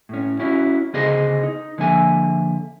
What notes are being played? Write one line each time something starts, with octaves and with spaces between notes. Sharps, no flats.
A2 C#4
C#4 E4 F#4
D2 C#3 B3 G#4 C5 D#5
D#4
D3 F3 A#3 E5 G#5